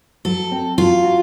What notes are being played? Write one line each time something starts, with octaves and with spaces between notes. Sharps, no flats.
F#3 A4
C4
F#3 F4
F#4